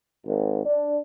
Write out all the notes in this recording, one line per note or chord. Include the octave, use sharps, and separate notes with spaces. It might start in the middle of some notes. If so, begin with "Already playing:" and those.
G#1
D4